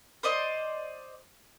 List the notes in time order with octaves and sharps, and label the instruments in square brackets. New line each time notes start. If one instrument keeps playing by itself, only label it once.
[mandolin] C5 D5 D#5